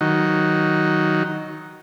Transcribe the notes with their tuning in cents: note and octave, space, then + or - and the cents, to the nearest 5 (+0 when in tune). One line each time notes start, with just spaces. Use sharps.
D#3 +0 F#3 +5